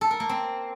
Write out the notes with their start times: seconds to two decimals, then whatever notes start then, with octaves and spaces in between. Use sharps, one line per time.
0.01 A4
0.11 A#4
0.20 A#3
0.29 C4